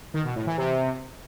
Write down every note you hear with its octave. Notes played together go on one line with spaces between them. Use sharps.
D#3
B2
A2
E3
C3